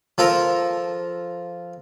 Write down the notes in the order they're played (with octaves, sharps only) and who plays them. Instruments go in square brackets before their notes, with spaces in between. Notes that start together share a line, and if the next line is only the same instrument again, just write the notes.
[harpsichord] F3 A4 A#4